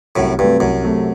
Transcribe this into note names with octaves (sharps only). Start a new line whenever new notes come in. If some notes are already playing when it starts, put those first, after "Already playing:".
C2 F#2 A2
G2 C3 F#3 A3 C4
C2 F#2
C3 F#3 A3 C4